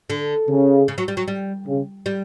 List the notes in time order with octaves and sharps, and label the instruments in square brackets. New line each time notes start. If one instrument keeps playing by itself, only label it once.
[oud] D3
[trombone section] C#3
[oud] C#3
F#3
G3
F#3
G3
[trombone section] C#3
[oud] G3